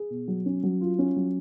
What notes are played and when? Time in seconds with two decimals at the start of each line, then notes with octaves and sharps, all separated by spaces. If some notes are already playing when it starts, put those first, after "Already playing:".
Already playing: G#4
0.10 B2
0.28 F#3
0.46 C#4
0.63 F#3
0.81 F4
0.99 C#4
1.16 F#3